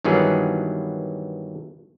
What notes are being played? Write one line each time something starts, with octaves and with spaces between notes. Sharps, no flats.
G2 D#3 E3 F#3 B3 G#4